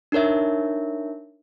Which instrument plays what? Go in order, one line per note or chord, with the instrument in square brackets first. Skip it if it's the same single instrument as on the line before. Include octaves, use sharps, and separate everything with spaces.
[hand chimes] D4 D#4 A#4 C#5 E5